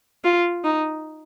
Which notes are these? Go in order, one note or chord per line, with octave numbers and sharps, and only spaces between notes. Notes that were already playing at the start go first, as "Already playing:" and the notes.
F4
D#4